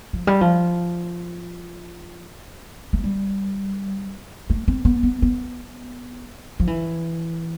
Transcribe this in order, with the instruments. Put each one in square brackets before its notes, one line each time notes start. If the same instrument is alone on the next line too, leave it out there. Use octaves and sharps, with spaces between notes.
[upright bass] F3
G3
F3
A3
G3
A3
C4
B3
B3
B3
F3
E3